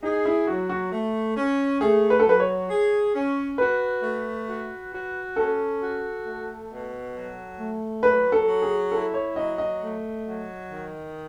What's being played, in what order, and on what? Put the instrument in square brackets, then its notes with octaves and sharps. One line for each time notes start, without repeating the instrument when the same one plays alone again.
[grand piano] D#4 [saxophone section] G#4
[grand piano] E4
[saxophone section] F#3 [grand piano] F#4
[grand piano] F#4
[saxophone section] A3
C#4
[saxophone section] A3 [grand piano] G#4
[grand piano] B4
A4
[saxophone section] F#3 [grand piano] B4
[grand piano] C#5
[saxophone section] G#4
C#4
[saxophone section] F#4 [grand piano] B4
[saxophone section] A3
F#4
F#4
[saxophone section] C#4 [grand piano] A4
[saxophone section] F#4
A3
B2
F#3
A3
[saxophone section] F#3 [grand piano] B4
[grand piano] A4
[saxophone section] F#3
[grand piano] G#4
[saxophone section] E4 [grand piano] A4
[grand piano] C#5
[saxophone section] F#3 [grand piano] D#5
[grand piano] D#5
[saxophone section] A3
F#3
D#3